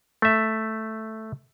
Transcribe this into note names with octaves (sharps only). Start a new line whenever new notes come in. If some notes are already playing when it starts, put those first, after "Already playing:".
A3 E5